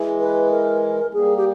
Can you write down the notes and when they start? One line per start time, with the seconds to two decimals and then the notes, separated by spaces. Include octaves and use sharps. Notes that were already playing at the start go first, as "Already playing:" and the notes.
Already playing: E3 G#3
0.20 B4
0.51 A#4
1.13 G3 A#3 G#4
1.37 G4